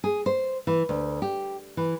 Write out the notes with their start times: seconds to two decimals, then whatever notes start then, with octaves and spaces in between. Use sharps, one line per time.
0.04 G#4
0.26 C5
0.67 E3
0.89 D2
1.22 G4
1.77 E3